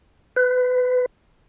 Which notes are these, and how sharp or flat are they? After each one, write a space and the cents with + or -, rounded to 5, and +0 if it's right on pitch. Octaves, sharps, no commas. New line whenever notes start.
B4 +25